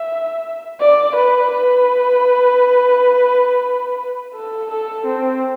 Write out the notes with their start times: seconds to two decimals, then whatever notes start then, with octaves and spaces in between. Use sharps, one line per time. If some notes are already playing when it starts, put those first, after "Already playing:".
Already playing: E5
0.80 D5
1.16 B4
1.51 B4
4.35 A4
4.71 A4
5.06 C4